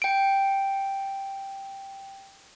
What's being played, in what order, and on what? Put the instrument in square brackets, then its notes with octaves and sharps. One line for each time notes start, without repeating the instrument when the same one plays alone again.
[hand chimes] G5 D7